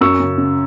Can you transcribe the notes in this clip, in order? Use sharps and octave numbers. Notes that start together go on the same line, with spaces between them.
F#2 C#6 E6
C#3
C#3